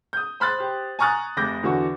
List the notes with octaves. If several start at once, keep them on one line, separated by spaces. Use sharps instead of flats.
D#6 G6
C5 B5 F#6 A6
G4 C5
G#5 A#5 C#6 D#6 F#6 A6
F1 B5 D6 G6 A#6
E2 D3 F#4 C#6